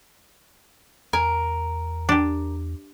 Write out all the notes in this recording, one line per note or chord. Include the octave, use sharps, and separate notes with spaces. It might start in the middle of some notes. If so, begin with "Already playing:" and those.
E2 A#4 G#5
D4 G4